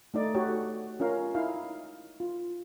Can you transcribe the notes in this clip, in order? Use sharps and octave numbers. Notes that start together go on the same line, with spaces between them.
A3 D#4 D5
F#4 G4 A4 C#5
C#4 F4 A#4 F5
D#4 E4 F5
F4